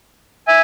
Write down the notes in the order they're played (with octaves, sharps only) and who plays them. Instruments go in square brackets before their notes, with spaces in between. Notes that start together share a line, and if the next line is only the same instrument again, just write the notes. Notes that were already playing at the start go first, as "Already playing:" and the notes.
[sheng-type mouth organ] E5 G#5